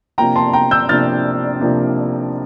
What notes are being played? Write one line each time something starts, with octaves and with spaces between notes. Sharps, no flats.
C3 F3 A#3 D4 G5 A#5
A5 C6
G5 A#5
E6 G6
C3 F3 A#3 D4 F6 A6
C3 F3 A#3 D4